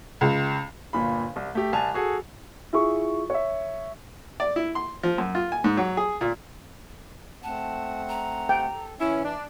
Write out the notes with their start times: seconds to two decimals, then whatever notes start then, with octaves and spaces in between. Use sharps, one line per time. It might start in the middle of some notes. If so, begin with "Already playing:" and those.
0.21 C#2
0.93 G1 A#2 B5
1.36 C2
1.55 A3 G4
1.73 C2 G#5 A5 F7
1.94 F#4 G#4 A4
2.73 E4 F4 G#4 C#6
3.30 C#5 E5
4.40 D5
4.56 E4
4.75 C6
5.03 F3
5.18 F#2
5.35 F4
5.52 G#5
5.64 G#2
5.77 F#3
5.97 G#4
6.21 A#2
7.43 A3 C4 F#5 A5
8.08 A#5
8.49 G5
8.73 A4
9.00 E3 C#4 E4 E5
9.24 D4